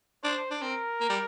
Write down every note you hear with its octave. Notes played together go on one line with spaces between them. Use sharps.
D4 C5
D4
C4 A#4
A#3
G3